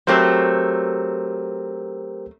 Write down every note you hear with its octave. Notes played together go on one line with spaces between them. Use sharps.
F#3 A3 C4 G4 A#4 C5